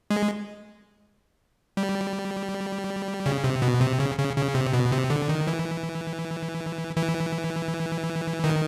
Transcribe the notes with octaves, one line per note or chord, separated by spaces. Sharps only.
G#3
G3
C#3
C3
B2
C3
C#3
C#3
C#3
C3
B2
C3
D3
D#3
E3
E3
D#3